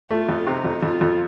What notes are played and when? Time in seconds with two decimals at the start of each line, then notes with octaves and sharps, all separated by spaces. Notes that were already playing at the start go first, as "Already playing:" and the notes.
0.11 A3 F4
0.29 F2
0.47 C3 D#4
0.64 F2
0.83 F2 F4
1.01 F2